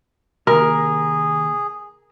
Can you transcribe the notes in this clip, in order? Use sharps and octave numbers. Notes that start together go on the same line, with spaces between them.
C3 D#3 A#3 G#4 A#4